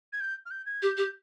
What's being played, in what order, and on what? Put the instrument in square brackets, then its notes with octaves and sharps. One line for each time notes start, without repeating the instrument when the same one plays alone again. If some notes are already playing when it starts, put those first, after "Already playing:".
[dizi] G#6
G6
F6
G6
G#6
[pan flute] G4 [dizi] G6
[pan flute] G4